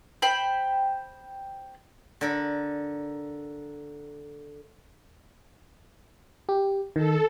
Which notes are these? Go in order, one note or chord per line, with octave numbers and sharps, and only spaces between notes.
C5 G5 B5
D3 A#4 B5
G4
D#3 A4